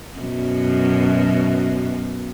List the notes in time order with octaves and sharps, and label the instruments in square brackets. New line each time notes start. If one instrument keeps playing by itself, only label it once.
[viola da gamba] F#2 B2